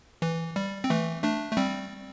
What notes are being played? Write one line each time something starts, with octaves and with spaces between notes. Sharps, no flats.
E3
G3
C4
E3 A3
A3 D4
A3
G3 C4